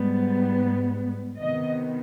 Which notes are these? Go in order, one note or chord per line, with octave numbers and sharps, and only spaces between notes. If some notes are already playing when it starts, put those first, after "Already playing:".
Already playing: G#2 G3 B3
C3 D#3 B3 D#5